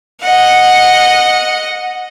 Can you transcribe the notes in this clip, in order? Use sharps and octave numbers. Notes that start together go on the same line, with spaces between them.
D#5 F#5